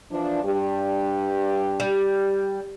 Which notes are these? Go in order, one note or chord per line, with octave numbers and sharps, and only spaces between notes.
E3 F3 D4
G2 D4 G4
G3